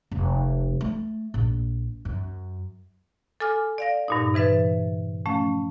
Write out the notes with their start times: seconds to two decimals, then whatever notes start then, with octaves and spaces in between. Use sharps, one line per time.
0.11 F1
0.81 A3
1.34 A#1
2.05 F#2
3.40 A4 G#5 D6 F6
3.78 D5 F5 A#6
4.08 G2 A#2 D#4
4.34 C3 E3 B4 E5 A6
5.26 F3 A3 C#4